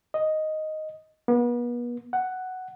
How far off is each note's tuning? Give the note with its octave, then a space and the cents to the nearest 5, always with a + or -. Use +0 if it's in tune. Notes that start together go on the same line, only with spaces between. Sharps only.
D#5 +0
B3 -40
F#5 +5